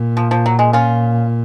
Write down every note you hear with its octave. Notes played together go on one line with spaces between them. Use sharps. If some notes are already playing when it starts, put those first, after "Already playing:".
Already playing: A#2
F3
F3
F#3
G#3
C#4 F4